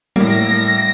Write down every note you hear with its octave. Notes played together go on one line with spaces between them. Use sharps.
A2 G3 A#3 A#6